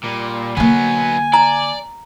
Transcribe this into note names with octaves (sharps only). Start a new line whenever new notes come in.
A#2 G3
D3 F#3 A#3 B3 G#5
D5 A#5